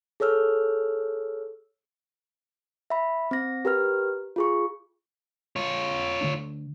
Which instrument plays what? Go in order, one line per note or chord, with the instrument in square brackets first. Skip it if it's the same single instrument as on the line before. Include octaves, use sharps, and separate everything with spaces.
[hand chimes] G#4 A4 C#5 E6 F6
E5 B5
C4 A#6
G4 A#4 B4 F6
F4 G#4 C#6
[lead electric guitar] F4 C#5
[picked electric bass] D3 A3 D4